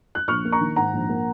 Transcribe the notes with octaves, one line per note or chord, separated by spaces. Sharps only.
F#6
A#1 C#6 F6
A#3
A#5 C#6
D#3
G#2 F#5 A#5
A#1
A#3